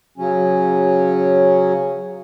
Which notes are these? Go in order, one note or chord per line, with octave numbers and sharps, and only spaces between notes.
C#3 F#3 C#4